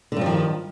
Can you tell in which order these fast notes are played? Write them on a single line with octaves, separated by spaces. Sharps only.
D3 G2 F3 D#3